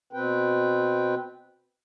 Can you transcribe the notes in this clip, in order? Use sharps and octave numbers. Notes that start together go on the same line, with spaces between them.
B2 C4 B4 G5